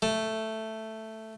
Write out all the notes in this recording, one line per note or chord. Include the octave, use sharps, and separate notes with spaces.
A3